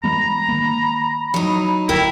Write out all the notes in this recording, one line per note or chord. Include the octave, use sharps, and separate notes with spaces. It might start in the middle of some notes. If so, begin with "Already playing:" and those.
E3 G#3 B3 A#5 B5
D#3 G#3 A#3 B5
F#3 D#4
D1 D2 E4 A#4 G5